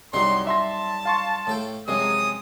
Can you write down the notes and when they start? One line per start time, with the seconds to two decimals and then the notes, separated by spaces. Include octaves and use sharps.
0.13 C2 F#2 F#3 G3 D#4 C6
0.47 E5 A5 C6 A#6
1.05 F5 C6 C#6
1.47 A2 A4 G5
1.88 F#2 C3 F3 F#3 G#3 D#6